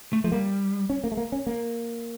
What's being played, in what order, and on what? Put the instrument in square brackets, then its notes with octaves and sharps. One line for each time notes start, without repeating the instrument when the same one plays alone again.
[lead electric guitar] A3
[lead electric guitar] F3 [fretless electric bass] A3
[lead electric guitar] G3 [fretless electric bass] A#3
[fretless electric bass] C#4
A#3
A3
A#3
C#4
A#3